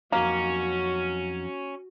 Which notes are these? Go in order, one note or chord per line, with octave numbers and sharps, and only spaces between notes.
F2 F#3 A#3 C#4 D#4 F#4